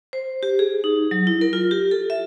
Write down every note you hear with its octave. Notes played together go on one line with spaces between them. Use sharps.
C5
G4
G#4
D#4
F#3
E4
A#4
F4
G4
A4
E5